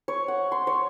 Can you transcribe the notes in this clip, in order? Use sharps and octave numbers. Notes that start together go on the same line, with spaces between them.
C#5
F#5
C6
C#5